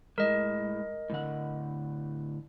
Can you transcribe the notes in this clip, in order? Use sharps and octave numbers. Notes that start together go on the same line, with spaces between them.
A2 G#3 A#4 D#5
A2 D3 F#5